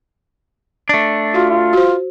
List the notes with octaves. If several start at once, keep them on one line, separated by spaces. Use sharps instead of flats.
A3 D4
F4 F#4
F4
F#4 C5